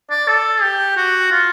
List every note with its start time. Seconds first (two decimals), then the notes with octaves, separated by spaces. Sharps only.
0.10 D5
0.28 A4
0.62 G4
0.97 F#4
1.32 F4